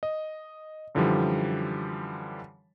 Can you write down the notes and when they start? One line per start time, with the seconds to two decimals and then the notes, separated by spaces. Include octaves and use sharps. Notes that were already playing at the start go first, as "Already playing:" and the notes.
0.03 D#5
0.95 F#2 D3 E3 F3 G3